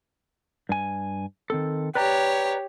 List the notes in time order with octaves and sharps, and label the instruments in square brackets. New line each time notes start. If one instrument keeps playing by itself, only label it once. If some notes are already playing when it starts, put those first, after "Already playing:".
[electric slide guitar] G2 G#5
D#3 C4 A4
[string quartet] G4 C#5 [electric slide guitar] B4 D5 A#5